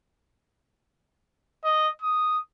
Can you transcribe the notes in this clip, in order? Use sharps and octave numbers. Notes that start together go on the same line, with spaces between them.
D#5
D#6